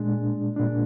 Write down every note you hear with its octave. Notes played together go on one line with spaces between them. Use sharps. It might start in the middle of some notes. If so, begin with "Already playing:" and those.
Already playing: A#2 G#3 D4
A#2 G#3 D4